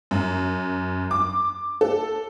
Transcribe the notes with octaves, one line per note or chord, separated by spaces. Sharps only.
F#2
D6
A4